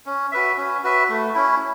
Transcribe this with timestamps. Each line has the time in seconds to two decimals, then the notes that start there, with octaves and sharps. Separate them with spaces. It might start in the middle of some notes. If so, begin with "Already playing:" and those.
0.06 C#4
0.32 F#4 B4 E5
0.57 C#4
0.84 F#4 B4 E5
1.09 A3
1.35 C#4 E4